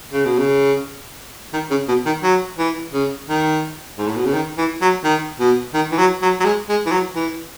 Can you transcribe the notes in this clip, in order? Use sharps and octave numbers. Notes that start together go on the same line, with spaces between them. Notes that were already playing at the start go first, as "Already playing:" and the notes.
C#3
B2
C#3
D#3
C#3
B2
D#3
F#3
E3
C#3
D#3
G#2
A2
B2
C#3
D#3
E3
F#3
D#3
B2
D#3
E3
F#3
F#3
F#3
G#3
G#3
E3
F#3
E3